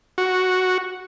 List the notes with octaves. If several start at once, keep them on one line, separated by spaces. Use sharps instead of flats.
F#4